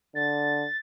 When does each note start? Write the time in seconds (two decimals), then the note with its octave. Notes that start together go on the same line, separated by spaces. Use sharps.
0.15 D3 A6